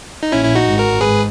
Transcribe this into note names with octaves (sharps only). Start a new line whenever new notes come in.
D#4
A#1 A#2 C#4 E4
E4
D#4 F#4
G#1 G#2
F#4 A#4
G#2 G#4 B4